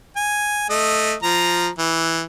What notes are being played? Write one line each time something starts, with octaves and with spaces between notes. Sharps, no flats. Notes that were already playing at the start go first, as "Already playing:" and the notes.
G#5
A3 D#5
F3 A#5
E3